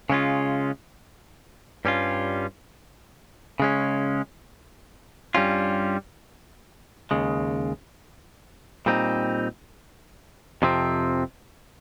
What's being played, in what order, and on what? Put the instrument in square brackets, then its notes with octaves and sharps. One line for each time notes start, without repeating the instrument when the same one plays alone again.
[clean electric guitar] C#3 G#3 C#4 F4
G2 G3 C#4 F4
C#3 G#3 C#4
G2 G3 C#4 F4
D#2 C#3 G#3
A#2 G3 C4 D#4
F2 C3 F3 C4